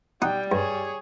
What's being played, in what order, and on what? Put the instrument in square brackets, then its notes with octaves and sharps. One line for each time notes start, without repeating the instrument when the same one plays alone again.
[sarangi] G3 [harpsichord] D#4 F#5 D#6 [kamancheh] G5
[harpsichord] G2 [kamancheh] G#4 C#5